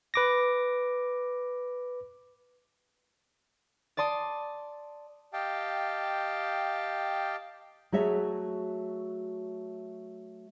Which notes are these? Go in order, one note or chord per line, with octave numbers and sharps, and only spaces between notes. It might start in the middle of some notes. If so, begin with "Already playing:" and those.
B4 D6 A#6
D5 A5 C6 D#6
G4 D#5 F5 G5 A5
F#3 A3 F#4 G#4 C#5 E5